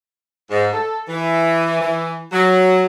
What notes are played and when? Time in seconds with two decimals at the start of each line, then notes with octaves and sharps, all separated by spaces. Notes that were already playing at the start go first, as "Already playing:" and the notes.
0.50 G#2
0.72 A4
1.09 E3
1.81 E3
2.32 F#3